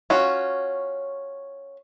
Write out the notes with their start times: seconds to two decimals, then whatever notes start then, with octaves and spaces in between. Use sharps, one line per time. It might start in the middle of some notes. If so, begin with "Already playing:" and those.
0.10 C#4 F4 F#4